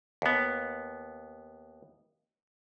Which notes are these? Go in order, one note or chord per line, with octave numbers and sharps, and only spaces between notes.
D#2 B3